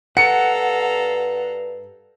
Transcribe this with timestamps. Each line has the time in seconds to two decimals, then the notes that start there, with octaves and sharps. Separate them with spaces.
0.17 G2 A4 F5 F#5 A#5 C#7